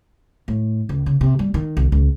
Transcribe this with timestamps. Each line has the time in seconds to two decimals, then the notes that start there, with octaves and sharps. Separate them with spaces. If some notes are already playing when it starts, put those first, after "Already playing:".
0.48 A2
0.89 C#2
1.06 C#3
1.21 C3
1.39 G3
1.54 D#3
1.77 C2
1.92 C#2